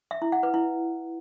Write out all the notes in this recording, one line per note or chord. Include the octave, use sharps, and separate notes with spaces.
E5
E4
F#5
B4
E4